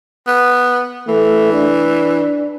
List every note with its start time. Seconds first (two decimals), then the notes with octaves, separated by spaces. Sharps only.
0.27 B3
1.08 E3 A3
1.53 D4